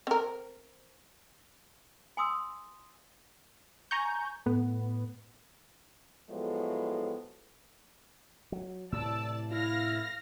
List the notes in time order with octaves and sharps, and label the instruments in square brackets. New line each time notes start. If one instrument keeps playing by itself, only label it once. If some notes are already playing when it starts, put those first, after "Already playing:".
[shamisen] C4 A#4
[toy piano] G#5 C6 D#6 E6
[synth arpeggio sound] G#5 A#5 C#6 G6
A2 B3
[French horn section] A2 F3 F#3 G#3 A3 B3
[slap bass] F#3
[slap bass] A2 C3 E3 [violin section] D5 A5 [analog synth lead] E6
[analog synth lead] E4 [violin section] F5 F6 A#6